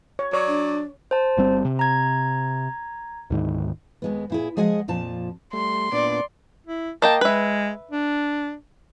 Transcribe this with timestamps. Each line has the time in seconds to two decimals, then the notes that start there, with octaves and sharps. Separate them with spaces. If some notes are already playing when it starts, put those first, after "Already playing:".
0.19 C#5
0.33 F#3 C#5 D5
0.47 D4
1.11 C5 A5
1.37 G1 G3 C4
1.65 C3
1.79 A#5 G#6
3.30 D2 G#2 D#3
4.02 D#2 G#3 B3
4.30 A#2 E4 G#4
4.57 F3 G#3 G#4 D#5 F#5 G#5
4.88 F2 A#2 F3 A5
5.53 G3 A3 C6
5.92 A#2 B3 D4 D5
6.67 E4
7.02 A#3 D#5 G5 A5
7.21 G#3 B4 E5
7.91 D4